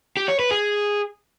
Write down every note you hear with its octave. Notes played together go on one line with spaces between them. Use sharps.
G4
C#5
B4
G#4